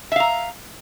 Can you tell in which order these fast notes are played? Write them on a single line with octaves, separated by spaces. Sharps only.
E5 F5 A#5